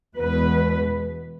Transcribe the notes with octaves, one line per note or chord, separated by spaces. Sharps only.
E2 B2 G#3 B4